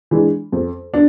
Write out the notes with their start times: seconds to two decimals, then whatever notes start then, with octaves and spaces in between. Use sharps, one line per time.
0.11 E3 G#3 D4
0.52 F2
0.94 D4